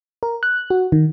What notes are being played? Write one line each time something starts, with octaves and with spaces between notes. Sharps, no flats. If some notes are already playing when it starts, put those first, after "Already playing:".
A#4
F#6
F#4
D#3